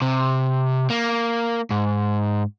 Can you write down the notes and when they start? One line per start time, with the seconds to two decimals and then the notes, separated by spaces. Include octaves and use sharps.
0.02 C3
0.90 A#3
1.71 G#2